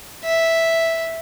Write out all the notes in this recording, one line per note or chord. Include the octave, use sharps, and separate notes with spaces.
E5